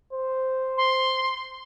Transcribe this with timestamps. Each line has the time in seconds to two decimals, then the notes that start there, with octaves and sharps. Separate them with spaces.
0.13 C5
0.77 C6